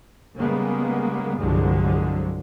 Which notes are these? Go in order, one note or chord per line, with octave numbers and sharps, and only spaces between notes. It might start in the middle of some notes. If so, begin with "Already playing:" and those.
C#3 G3 G#3 A#3 B3
C2 G2 D3 F3 F#3 G#3